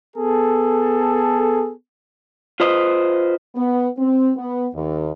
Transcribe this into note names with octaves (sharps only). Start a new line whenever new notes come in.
B3 G#4 A4
F4 B4 C5 D#5
B3
C4
B3
D#2